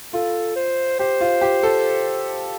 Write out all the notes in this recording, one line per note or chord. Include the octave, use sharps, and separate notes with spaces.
F4 A4
C5
G4 C5
F4
G4
A4